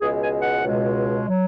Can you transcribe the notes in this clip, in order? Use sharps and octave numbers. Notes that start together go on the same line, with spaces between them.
C#2 B2 G#3 G#4
G#5
F#5
C#2 B2 G#3
F#3